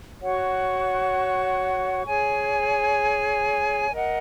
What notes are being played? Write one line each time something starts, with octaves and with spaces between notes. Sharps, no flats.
F#4 C#5 F#5 C#6
G#4 C#5 G#5
A#4 D#5 F#5